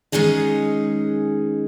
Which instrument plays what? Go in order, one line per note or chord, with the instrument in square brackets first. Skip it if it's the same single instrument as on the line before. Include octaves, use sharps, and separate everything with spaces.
[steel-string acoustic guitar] D#3 G#3 C#4 D#4 G#4 D#5